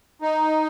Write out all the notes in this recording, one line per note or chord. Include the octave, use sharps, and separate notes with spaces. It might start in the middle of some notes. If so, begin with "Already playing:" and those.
D#4